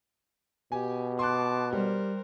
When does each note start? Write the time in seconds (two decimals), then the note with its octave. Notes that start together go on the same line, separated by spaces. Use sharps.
0.72 B2 G4 G#5
1.19 A5 C6 D6 F#6
1.73 G3 A#4 C5